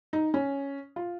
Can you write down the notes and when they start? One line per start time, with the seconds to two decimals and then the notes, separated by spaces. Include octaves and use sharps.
0.13 D#4
0.34 C#4
0.96 F4